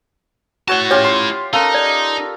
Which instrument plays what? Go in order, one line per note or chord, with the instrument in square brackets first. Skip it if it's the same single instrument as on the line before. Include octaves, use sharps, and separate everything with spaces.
[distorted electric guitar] E4 A5 [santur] F#4 C#5 F#5
[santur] C#4 F4 G4 [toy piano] C#5
[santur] C6
[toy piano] C#4 F5 [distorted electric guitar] D#4 [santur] A4 A#4
[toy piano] D5